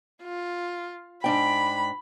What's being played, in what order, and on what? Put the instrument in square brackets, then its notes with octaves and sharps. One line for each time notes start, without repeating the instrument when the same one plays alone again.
[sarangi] F4
[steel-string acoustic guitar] G#2 D4 G5 [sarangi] B5